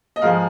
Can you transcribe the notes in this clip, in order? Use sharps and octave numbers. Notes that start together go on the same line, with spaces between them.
D#5
G#2 F3 G#3 F5